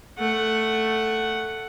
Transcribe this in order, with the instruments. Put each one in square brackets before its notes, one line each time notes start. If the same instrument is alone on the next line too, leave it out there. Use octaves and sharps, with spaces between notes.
[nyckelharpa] A3 F#5